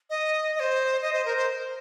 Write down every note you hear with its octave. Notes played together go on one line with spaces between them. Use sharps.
D#5
D#5
C5
D#5
C5
A#4
C5